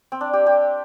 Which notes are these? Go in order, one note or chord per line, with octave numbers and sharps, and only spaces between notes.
C4
D4
G4
G4